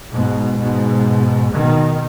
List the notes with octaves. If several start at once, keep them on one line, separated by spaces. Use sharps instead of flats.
G#2 B2
G#2 B2
B2 D#3